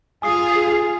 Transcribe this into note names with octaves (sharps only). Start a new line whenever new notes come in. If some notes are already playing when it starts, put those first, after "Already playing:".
F4 G#4 F5 G#5 D#6 C7